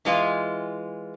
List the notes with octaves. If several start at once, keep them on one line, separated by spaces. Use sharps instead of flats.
E3 G#3 F4